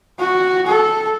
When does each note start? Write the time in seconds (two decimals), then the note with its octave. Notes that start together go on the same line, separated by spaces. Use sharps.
0.20 F#4
0.67 A4